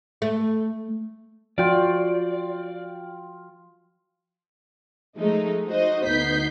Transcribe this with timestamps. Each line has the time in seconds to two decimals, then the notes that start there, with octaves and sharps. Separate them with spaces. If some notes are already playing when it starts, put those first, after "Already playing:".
0.22 A3
1.58 F3 F4 F#4 D5 G5
5.17 F3 G#3 A3 D#4
5.67 D#4 F#4 C5 D#5
6.06 D2 B3 D#4 G6 B6 C7